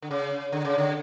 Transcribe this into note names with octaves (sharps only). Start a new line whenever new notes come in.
D3
C#3
D3
C#3
D3